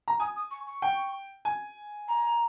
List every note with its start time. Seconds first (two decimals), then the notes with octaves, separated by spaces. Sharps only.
0.08 A#5
0.20 G#5 D#6
0.36 D#6
0.51 C#6
0.66 C#6
0.82 G5
1.45 G#5
2.08 A#5